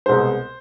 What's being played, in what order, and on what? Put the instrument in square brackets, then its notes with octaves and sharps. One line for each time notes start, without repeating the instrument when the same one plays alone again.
[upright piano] C2 B2 G#3 B3 C5